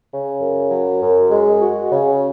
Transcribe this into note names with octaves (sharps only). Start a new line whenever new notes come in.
C#3
F#2
F#3
F#2
G#3
F#4
C#3